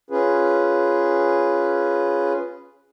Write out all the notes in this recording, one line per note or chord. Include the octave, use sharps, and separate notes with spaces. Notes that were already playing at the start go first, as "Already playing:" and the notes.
C#4 F4 G#4 B4